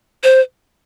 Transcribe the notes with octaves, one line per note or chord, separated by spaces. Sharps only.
C5